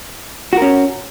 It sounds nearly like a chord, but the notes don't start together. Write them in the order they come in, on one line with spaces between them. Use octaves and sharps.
F#4 A#4 C#4